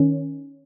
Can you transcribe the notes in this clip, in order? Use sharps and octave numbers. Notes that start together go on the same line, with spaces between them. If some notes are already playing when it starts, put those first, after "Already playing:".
Already playing: D#3 C#4